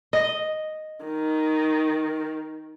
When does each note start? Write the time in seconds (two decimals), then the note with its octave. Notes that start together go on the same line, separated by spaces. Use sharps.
0.13 D#5
1.05 D#3